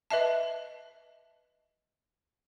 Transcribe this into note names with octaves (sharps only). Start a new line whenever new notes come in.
B4 D#5 E5 A5